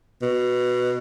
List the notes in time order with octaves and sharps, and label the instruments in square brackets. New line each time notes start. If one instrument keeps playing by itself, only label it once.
[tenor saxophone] B2